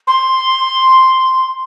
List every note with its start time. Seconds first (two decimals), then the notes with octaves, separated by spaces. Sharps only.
0.07 C6